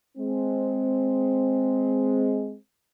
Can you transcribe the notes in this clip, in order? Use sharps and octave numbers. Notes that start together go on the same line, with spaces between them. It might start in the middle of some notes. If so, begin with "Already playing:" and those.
G#3 C4